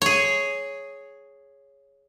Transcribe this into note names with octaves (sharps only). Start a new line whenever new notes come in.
G#4 C#5